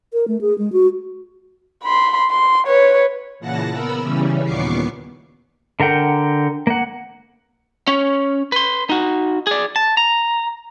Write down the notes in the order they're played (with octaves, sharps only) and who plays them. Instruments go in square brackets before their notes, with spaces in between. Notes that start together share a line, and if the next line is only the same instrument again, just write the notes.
[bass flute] A#4
A3
G#4
G#3
F#4
[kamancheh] B5 C6
C6
B4 C#5
[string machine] A#2 C#3 E3 F#5 A5 A#6
B3 A#4 B4 B5 E6
C#3 E3 G3 C#4
D#2 A#2 B3 C#6 D6 C7
[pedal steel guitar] D3 A#4 F#5 G5
A#3 F#5
[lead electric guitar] C#4 C#5
B4 C6
D#4 F#4
G#4 D5
A5
A#5